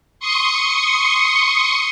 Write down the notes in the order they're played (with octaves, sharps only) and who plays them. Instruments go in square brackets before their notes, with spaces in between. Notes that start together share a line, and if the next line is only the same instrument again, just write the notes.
[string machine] C6 C#6 D#6 C#7